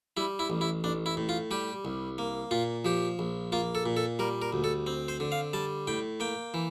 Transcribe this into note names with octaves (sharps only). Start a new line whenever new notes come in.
G3 E4
E4
A1
E4
A1 D4
E4
A2
F4
G3 G4
C2
A#3
A#2 F4
F3 G4
A#1
A#3 F4
A4
A#2
A4
G3 A#4
A#4
D2
A4
C4
C5
D3
F5
G3 A5
A2 G5
A#3 G5
E3